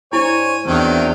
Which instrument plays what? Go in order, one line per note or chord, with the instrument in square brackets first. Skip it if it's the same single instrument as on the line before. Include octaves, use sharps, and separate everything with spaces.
[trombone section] G2 C5 [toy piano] E4 [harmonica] C#5 G#5
[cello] E2 [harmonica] D#3 F#3 [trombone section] C4 D4